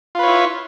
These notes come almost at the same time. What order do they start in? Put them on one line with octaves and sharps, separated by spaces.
F4 B4 C#5 E4